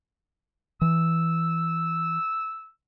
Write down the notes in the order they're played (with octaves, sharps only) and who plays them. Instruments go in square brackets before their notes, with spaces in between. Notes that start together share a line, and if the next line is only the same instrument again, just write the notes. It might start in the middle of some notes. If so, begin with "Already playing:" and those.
[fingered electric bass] E3 [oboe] E6